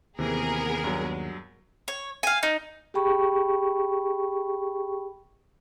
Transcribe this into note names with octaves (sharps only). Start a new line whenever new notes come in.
D#2 C3 E3 B3 G#4 A#4
G2 F#3
C#5
F5 G#5
D#4
G4 G#4 G5 B5 C#6